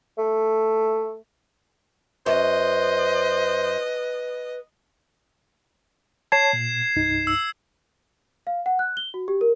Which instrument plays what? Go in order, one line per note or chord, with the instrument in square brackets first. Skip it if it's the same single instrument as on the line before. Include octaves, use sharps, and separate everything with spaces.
[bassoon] A3
[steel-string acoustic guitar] F#2 [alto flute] B4 [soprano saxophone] C5 [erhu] D#5
[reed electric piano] C#5 A5 [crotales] G#6 C7 E7
[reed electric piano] A#2
C2 G2 D#4
[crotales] E6
[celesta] F5
F#5
F#6
G7
F#4
G4
A#4